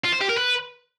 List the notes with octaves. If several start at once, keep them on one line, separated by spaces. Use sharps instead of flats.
F4
C5
G4
A#4
B4